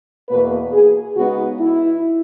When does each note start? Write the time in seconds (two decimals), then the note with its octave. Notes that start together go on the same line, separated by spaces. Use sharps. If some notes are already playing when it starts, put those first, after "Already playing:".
0.29 E2 B2 A#3 B4
0.72 G#4
1.16 C#3 G#3 B3 D#4 F#4
1.60 E4